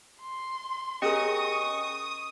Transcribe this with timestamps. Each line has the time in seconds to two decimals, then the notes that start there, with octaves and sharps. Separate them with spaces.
0.19 C6
1.02 C#4 G4 G#4 A#4 D#5 C#6 D#6 C#7